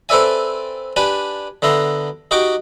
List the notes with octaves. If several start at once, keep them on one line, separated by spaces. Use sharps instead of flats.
C4 A4 B4 D5 E5 G#5
D4 G4 B4 G#5
D3 B3 E5 A#5 C6
D#4 F#4 G4 G5 C#6 D6